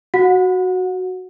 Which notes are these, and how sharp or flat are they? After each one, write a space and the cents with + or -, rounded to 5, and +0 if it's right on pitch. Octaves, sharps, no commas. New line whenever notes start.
F#4 +0 F#5 -30